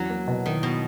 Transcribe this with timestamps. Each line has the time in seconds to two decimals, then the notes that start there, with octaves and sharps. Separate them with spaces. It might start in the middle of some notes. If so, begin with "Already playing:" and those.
Already playing: E2 F#3 C#4
0.10 A#3
0.28 B2
0.45 D#3 E4
0.63 B2